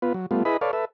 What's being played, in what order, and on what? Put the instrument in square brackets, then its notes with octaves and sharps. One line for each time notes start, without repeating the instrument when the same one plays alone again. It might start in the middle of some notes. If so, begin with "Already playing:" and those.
[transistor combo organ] B3 F4 B4
F#3
G3 A3 B3 F4
E4 G#4 B4 D#5 B5
A4 B4 C#5 D5 F5
A4 B4 E5